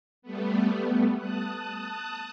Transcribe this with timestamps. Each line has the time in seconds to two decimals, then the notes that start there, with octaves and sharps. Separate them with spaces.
0.22 G3 A3 B3
1.18 A5 D#6 F#6